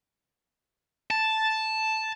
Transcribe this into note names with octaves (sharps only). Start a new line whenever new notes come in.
A5